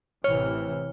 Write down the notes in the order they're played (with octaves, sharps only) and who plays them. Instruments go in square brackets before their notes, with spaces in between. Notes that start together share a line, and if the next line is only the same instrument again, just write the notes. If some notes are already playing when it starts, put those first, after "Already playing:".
[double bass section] A1 C3 E3 [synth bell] C#5 F6